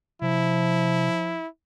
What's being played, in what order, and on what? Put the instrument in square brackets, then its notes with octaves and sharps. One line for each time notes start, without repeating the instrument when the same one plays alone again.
[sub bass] C3 [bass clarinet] F3 [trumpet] E4